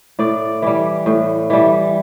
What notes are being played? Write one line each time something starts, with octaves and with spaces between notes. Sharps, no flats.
A2 D5
E3 G3
A2
E3 G3